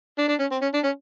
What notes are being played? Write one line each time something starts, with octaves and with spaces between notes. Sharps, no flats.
D4
D4
C#4
C4
C#4
D4
C#4